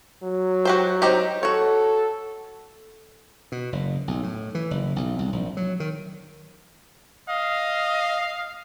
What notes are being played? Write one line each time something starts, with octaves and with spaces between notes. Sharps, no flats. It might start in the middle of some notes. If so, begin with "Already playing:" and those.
F#3
F#4 G4 C5
C4 D#4 G4
F#4 A4 C#5
B2
F#1
B1
A2
E3
F#1
B1
C2
A#1
F#3
D#3
D#5 F5